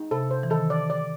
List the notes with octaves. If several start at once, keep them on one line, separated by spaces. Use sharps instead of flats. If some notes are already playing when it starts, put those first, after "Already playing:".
Already playing: D#4
C3 A4
C5
E3
D#3 A4
D5
D5